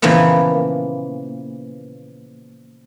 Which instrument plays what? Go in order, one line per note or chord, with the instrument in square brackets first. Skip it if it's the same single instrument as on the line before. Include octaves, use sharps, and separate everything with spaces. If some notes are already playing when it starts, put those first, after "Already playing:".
[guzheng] A#2 C#3 E3 F3 A#3 B3